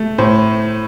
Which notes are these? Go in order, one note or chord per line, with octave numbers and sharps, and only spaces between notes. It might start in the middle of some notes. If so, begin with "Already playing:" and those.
Already playing: A3
A2 C5